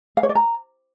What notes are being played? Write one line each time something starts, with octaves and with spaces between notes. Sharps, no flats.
F5
C#5
D5
A#5